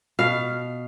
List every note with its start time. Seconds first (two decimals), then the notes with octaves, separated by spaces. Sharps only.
0.19 B2 F5